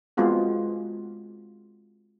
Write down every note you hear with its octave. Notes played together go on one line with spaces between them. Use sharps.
G#3 B3 C4 F4 F#4 G#4